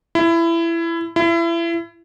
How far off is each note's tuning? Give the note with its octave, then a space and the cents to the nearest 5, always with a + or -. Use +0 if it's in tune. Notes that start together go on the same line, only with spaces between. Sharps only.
E4 +20
E4 +30